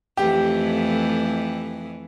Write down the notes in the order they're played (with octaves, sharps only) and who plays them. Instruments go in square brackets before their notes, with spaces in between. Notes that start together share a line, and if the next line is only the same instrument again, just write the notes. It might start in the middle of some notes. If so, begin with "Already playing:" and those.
[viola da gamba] F2 E3 A3 [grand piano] G4